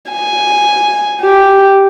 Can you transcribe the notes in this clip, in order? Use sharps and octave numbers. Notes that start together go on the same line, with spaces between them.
G#5
G4